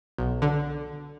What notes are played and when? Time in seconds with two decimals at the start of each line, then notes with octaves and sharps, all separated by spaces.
0.18 B1
0.42 D3